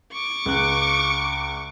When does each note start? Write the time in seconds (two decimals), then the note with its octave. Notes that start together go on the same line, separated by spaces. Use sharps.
0.12 C#6 D6
0.46 C#2 F#6